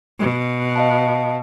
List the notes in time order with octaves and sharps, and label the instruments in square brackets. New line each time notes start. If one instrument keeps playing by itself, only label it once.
[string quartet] B2
[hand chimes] D#5 F5 A5